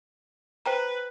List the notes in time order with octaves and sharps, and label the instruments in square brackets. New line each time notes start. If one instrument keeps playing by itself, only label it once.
[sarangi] B4 [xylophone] C5 G5 A#5